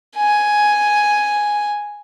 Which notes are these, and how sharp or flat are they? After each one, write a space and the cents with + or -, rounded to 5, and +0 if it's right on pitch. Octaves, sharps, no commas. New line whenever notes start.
G#5 +5